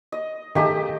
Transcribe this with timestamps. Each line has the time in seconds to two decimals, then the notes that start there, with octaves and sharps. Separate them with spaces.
0.12 D#5
0.55 D#3 A3 D#4 G4 G#4 D#5